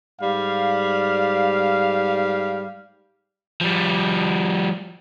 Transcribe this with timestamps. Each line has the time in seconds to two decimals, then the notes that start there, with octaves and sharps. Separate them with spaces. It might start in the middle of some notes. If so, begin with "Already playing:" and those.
0.22 G#2 G3 F5
3.61 F3 G3